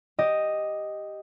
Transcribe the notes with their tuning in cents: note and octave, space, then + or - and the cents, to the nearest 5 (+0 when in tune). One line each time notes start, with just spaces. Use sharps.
G4 +0 D#5 +0